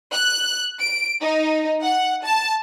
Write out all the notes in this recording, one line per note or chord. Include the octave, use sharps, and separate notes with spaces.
F#6
D7
D#4
F#5
A5